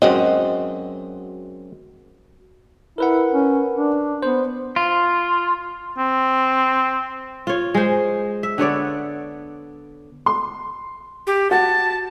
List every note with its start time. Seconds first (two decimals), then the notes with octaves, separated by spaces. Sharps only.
0.02 F#2 G#3 C4 F#4 D#5
2.98 E4 A#4 B4 F#5
3.32 C#4
3.75 D4
4.23 B3 C5
4.76 F4
5.98 C4
7.47 F4 C#5
7.75 G#3 C5
8.43 E5
8.58 D3 B3 C#5 D5
10.26 C6
11.27 G4
11.51 F#4 A5